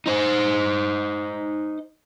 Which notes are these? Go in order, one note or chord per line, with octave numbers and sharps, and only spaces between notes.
D#4 C5